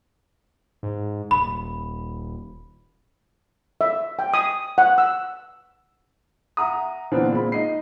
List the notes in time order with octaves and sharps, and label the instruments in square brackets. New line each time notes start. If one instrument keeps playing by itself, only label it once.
[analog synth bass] G#2
[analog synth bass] D#1 [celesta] B5
[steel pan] E5
G5
D#6
F#5
E6
[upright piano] E5 F#5 A#5 D#6
A#2 D3 E3 B3 C4 D4
A#2 G#3 C4 B5
D#4 D#5 C7